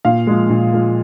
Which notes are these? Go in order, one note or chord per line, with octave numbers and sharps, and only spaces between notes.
A#2 F5
F3 G#3
A#2
F3 G#3